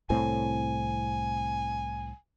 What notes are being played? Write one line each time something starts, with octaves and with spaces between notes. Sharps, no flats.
C2 A2 C4 G#5